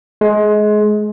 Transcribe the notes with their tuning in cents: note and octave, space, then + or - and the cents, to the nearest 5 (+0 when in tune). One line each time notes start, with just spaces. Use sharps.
G#3 +25